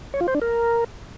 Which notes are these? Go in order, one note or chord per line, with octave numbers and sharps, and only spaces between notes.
C#5
F4
C5
D4
A#4